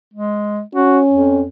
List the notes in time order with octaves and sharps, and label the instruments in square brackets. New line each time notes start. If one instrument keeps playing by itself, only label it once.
[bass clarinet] G#3
[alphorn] C#4 [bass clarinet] F#4
[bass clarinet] F2